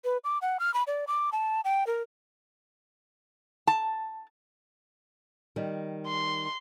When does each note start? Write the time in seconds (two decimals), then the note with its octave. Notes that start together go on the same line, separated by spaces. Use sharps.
0.04 B4
0.24 D6
0.42 F#5
0.60 F6
0.74 B5
0.87 D5
1.07 D6
1.32 A5
1.65 G5
1.87 A#4
3.67 A5
5.56 D#3 G3
6.07 C6